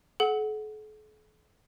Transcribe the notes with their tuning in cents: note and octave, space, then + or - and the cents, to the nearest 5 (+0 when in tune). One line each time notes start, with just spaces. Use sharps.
A4 -45 F#5 +0